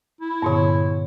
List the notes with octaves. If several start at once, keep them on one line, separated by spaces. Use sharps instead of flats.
E4
G2 A#2 D3 B3 C#5